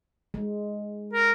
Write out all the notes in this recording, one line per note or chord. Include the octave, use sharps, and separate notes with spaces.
G#3
A#4